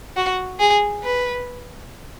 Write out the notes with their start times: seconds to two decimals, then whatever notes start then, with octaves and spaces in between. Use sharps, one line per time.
0.16 F#4
0.60 G#4
1.03 B4